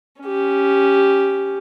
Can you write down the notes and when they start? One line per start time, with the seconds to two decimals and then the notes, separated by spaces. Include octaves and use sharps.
0.22 C#4 G4